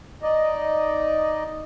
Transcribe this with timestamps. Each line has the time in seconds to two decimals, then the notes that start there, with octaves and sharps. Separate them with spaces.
0.22 D#4 D5 D#5